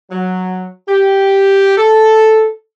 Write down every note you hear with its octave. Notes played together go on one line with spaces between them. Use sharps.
F#3
G4
A4